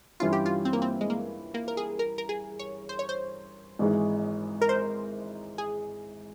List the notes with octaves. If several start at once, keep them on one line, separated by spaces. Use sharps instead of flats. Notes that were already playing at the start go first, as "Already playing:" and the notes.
G2 E3 G3 C#4 E4 F4
G4
F4
C4
A#3
C4
G#3
A#3
A#3
A#4
G#4
A#4
A#4
G#4
C#5
C5
C#5
C5
G#1 G#2 E3 G#3
A#4
C5
G#4